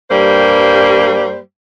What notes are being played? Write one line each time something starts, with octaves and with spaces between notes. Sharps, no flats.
G2 G3 A#3 C5